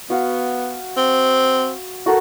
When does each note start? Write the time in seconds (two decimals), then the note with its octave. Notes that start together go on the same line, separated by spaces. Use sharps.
0.10 B3 F#4 F5
0.97 C4
2.06 F#4 A4 A#4